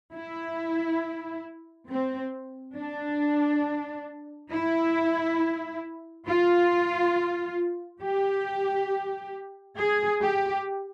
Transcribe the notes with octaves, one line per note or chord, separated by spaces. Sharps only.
E4
C4
D4
E4
F4
G4
G#4
G4